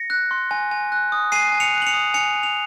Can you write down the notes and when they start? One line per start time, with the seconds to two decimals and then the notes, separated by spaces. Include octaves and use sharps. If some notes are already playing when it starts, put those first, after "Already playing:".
Already playing: A#6 C#7
0.10 F#6
0.31 C6
0.51 G#5
0.71 G#5
0.92 F#6
1.12 D#6
1.32 G#5 C7 D#7
1.52 G#5
1.60 C#7 F7
1.74 F#6
1.82 F#7
1.87 C#7 F7
1.93 D#6
2.14 G#5 C#7 F7
2.35 G#5
2.43 F7